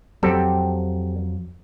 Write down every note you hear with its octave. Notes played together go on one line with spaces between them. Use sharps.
F2 F#3 C4 G4 A4